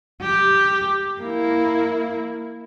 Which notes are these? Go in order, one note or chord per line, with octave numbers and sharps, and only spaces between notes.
G4
A#3 E4